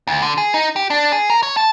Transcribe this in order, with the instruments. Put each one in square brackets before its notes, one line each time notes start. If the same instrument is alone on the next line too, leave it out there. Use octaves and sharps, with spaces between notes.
[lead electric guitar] D2
D3
G#4
D#4
G4
D4
G#4
A#4
C#5
A5